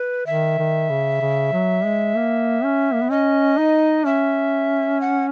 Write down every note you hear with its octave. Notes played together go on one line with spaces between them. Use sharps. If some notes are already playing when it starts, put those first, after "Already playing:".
Already playing: B4
D#3 E5
D#3
C#3
C#3
F#3
G#3
A#3
C#4
A#3
B3
C#4 D#5
D#4
C#4 E5
F#5